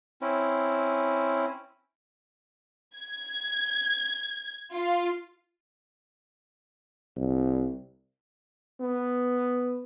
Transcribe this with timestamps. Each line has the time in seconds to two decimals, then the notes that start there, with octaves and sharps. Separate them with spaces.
0.22 C4 C#4 E4
2.97 G#6
4.73 F4
7.17 C2
8.80 B3